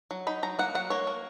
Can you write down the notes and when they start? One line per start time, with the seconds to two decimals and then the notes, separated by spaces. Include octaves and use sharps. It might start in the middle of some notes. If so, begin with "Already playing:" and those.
0.11 F#3
0.27 D#4 B5
0.43 F#3 A#5
0.59 A#3 F#5
0.75 F#3 F#5
0.90 A#3 C#5
1.07 A#3